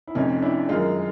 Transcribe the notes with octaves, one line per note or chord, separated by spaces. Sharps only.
E4
F1 F2 C3 C#4 D#4
D4 E4
F#2 D#3 G#3 D#4 F4